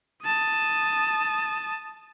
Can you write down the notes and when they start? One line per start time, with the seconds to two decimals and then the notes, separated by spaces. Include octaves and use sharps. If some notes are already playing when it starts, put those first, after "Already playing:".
0.23 A5 D#6